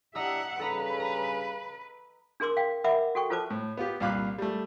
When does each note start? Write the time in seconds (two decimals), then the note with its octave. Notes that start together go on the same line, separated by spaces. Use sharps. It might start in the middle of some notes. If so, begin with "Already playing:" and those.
0.15 D4 E4 G4 D#5 E5 F#5 A#5 E6
0.59 G2 C#3 A4 B4 A#5 B5
1.00 A#5
2.40 D4 G#4 A#4 C6 D6 E6
2.57 F5 G5
2.84 A#4 E5 F#5 B5 D6
3.15 F#4 A4 G5 C#6
3.30 F4 A4 B4 C5 A5 D6
3.50 A2
3.77 B3 F4 G4
4.00 C2 A#2 F5 B5 D6 F#6
4.38 G3 A3